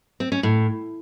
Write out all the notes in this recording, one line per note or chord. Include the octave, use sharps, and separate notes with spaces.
C4
C#4
A2